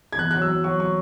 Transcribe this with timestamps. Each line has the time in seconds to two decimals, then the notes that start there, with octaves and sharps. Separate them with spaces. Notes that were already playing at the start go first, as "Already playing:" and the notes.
0.13 G#6
0.18 E2 F#6
0.31 F#3 F#6
0.42 E6
0.49 F#3
0.64 F#3 C#6
0.80 C#6